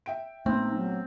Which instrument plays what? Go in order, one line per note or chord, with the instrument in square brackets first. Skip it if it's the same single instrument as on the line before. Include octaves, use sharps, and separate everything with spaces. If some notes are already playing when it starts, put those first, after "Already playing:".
[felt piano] E5 G5 D7
[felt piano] A#1 [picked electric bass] A3 B3 [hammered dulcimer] C4 [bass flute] D#4
[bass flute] F#3